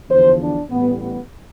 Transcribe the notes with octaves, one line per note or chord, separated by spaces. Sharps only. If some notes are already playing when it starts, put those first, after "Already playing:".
E2 D3 F3 C5
D4
A1 A2 G3 B3
B3